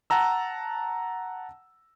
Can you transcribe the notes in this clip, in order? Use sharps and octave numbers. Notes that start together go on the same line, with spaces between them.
F#5 A5 A#5 E6